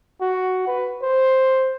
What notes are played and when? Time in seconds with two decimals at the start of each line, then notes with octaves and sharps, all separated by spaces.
0.21 F#4
0.67 B4
1.02 C5